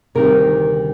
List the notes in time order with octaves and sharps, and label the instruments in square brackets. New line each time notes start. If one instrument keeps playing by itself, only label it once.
[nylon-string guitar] D2 C3 D#3 G3 A#4